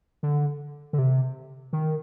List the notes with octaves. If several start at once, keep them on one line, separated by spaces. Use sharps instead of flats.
D3
D3
C3
D#3